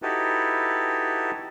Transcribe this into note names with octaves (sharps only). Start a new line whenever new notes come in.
D#4 E4 F#4 G4 A4 B4